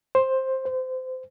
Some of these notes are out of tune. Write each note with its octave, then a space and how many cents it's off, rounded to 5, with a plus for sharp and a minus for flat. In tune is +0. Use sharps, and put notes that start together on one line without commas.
C5 +10
C5 -25